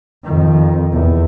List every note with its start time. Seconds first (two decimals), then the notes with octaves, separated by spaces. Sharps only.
0.24 F2 D#3
0.92 E2